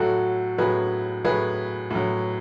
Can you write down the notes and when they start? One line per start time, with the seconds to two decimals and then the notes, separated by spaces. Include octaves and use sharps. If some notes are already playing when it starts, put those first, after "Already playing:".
Already playing: A2 F#3 F#4 A4
0.58 A2 F#3 G#4 B4
1.24 A2 F#3 G#4 B4
1.91 A2 F#3